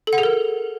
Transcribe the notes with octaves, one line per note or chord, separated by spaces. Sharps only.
A4
F#5
G#4
A#4